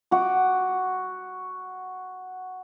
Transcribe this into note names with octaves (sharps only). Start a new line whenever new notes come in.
F#4 D6